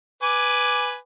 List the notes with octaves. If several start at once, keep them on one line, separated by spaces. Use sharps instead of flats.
B4 G#5 D6